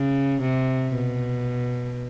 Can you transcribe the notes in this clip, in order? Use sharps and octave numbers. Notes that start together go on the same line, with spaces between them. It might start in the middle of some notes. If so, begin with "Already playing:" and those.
Already playing: C#3
C3
B2